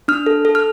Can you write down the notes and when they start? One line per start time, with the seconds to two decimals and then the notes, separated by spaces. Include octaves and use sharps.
0.08 D4 F6
0.26 A4
0.45 A4
0.55 F6